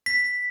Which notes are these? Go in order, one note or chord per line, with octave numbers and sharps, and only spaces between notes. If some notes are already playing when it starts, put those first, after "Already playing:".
B6